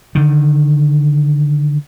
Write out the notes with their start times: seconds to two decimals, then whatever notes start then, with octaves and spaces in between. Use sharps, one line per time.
0.15 D3 D#3